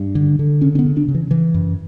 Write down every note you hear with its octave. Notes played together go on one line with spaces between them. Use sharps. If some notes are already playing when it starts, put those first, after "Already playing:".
Already playing: G2
D3
D3
C#3 C#4
C#4
B3
C#3
D4
C#3
E3
C#3 E3
F#2